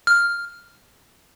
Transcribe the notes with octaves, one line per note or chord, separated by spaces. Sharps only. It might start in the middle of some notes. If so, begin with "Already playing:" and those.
F6